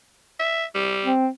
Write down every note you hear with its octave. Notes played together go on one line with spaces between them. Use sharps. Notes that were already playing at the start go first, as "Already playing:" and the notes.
E5
G3
C4